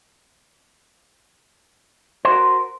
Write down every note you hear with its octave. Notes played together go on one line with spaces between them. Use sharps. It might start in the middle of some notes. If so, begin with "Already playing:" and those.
F#4 A#4 C5